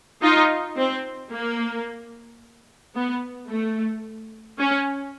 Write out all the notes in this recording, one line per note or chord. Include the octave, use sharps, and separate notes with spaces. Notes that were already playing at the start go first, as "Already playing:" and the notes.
D#4 F4
C4
A#3
B3
A3
C#4